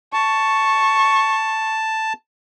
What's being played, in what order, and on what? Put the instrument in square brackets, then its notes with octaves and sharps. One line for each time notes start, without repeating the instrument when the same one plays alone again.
[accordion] A5 [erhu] C#6